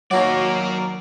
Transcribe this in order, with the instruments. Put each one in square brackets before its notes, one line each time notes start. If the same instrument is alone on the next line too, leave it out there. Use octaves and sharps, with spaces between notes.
[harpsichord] D#2 F#4 [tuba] F#3 [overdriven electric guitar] A#4 D5 [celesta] C#5 C#6